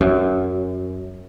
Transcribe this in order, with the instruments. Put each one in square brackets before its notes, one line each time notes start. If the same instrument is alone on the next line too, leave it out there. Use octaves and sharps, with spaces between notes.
[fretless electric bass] F#2